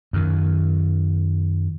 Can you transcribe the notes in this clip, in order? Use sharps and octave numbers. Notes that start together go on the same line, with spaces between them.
F#2 D#3